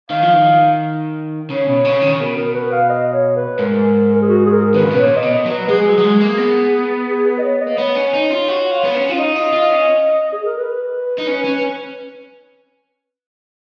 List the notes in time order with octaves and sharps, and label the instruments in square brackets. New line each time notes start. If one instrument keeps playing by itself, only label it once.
[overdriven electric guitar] D#3 [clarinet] F5
[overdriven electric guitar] F3
D#3
[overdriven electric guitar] C#3 [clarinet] C#5
[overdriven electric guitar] B2
C#3
D#3
C#3
[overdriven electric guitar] B2 [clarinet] A#4
[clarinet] A#4
B4
F5
D#5
C#5
B4
[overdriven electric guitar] G#2 [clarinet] A#4
[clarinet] A#4
G#4
F#4
G#4
A#4
[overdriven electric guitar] D#3 [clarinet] B4
[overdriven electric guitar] C#3
B2
[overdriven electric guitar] A#2 [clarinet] C#5
[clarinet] D#5
[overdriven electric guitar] B2
[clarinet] D#5
[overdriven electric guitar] F#3
[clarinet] B4
[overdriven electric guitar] G#3 [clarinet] G#4
[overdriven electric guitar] F#3
F#3
G#3
A#3
B3
[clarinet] G#4
B4
D#5
C#5
D#5
[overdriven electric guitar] A#3
[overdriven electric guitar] B3 [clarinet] C#5
[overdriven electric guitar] C#4
D#4
F4
F#4
F4
B3
C#4
F4
[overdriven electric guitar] D#4 [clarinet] D#5
[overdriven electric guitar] F4
F4
C#4
[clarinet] G#4
A#4
B4
[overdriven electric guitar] D#4
C#4
C#4